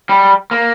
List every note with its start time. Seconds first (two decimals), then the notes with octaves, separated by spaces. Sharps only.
0.09 G3
0.51 A#3